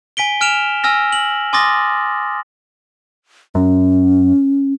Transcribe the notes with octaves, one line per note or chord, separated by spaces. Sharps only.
G#5 B6 D7 G7
G#5 F6 D7 E7 F7
G#5 E6 F6 A#6
F#7
G#5 C6 D6 D#6 A6 A#6
F#2 C#4